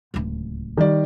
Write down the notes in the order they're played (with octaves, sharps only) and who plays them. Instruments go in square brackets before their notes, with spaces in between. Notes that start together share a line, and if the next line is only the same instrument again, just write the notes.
[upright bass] D1 C#2
[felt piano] D#3 G3 D5